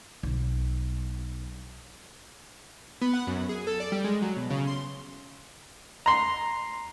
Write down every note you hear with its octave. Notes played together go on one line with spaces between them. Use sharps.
B1 F#3
B3
F#5
F#2
G#4
A4
D5
G3
G#3
F#3
B2
C#3
C6
A#5 C6